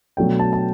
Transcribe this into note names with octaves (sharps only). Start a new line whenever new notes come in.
B2 F#3 A3 D4 G5
A5
A5